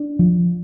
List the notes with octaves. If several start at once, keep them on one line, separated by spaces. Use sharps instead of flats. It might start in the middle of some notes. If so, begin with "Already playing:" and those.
Already playing: D4
F3